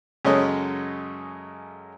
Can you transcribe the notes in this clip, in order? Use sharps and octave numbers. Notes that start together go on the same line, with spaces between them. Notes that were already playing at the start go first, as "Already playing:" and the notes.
F#2 C#3 G#3 A4 C#5 D#5